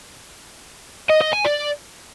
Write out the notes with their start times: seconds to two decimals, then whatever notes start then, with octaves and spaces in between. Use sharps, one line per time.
1.09 D#5
1.21 D#5
1.33 G#5
1.45 D5